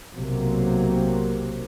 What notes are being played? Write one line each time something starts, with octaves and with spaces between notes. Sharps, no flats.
B1 C3 F#3 A#3